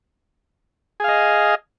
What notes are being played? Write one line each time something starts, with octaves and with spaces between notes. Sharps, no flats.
G#4 D#5 F5